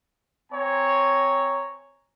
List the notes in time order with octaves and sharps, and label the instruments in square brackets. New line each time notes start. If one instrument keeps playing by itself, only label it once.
[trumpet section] C4 C#5 G#5 A#5